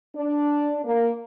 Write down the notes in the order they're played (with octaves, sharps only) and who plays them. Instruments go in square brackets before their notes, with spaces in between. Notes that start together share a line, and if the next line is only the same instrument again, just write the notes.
[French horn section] D4
A#3